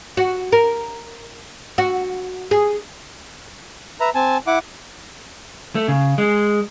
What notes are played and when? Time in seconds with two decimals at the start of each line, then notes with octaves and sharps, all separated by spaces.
0.17 F#4
0.52 A#4
1.78 F#4
2.51 G#4
4.00 B4 E5 A#5
4.15 C4 G#5 A5
4.47 E4 F#5 D6
5.75 A3
5.88 C#3
6.18 G#3